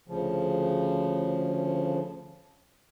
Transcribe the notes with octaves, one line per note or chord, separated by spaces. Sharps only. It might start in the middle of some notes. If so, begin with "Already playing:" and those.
D2 C#3 F3